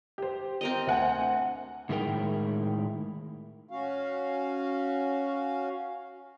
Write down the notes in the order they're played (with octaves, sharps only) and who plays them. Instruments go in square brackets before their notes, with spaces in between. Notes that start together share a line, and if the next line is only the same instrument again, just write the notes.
[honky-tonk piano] G4 C5
[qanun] C4 A#4 D#5
[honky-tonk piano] D2 F#5 G#5
[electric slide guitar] A2 D#3 G#3 E4 A#4 G5
[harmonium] C#4 F#4 F5